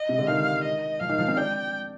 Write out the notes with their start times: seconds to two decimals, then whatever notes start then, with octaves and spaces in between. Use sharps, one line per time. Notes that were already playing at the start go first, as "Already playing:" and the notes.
Already playing: D#5
0.09 C3
0.19 D3
0.28 D#3 F5
0.64 D#5
1.00 F3 F5
1.09 D#3
1.18 F3
1.28 C4
1.37 D4 G5